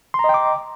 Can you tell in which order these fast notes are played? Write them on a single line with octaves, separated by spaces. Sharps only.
C6 A#5 D#5 G5 D6